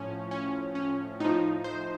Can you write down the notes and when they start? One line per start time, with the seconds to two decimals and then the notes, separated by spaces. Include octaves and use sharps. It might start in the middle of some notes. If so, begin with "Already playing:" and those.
Already playing: A2 F3 C#4
0.31 C#4
0.75 C#4
1.20 A2 F3 D#4
1.64 C5